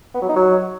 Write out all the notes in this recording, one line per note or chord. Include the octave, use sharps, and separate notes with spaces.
B3
F#3
D#4
F#3